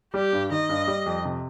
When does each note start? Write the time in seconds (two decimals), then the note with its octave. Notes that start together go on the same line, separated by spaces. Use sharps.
0.14 G3 G4
0.33 G2
0.51 D#3 D#5
0.69 G2
0.87 G3
1.06 F2
1.25 C3